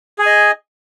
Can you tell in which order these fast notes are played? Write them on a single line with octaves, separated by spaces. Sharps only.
G#4 G#5 D#5